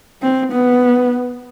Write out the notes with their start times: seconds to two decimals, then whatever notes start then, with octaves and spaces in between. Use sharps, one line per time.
0.22 C4
0.51 B3